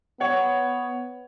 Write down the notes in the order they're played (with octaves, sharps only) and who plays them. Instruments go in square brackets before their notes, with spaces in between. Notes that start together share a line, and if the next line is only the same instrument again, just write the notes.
[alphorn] B3 [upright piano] C#5 F#5